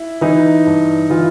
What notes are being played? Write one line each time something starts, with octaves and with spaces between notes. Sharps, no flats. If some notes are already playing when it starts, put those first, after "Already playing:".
Already playing: E4
E3 D#4
G2
E3 F4